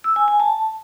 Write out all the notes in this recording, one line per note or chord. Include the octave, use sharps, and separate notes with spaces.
E6
G#5
G#5
A5